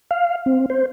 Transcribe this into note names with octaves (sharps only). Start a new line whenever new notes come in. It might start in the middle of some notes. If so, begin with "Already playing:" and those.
F5
C4
C5